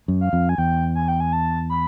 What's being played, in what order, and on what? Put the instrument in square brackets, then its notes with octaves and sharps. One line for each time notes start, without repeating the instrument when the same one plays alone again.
[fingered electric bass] F#2
[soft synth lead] F5
[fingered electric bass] F2
[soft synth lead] G#5
[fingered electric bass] E2 [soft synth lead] G5
[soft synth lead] G#5
G5
G#5
A5
B5